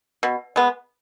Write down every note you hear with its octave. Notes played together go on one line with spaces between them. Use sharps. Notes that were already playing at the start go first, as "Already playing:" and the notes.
B2
G#3 B3